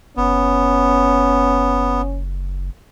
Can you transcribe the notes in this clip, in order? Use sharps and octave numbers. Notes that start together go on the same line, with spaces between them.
F#1 B3 C#4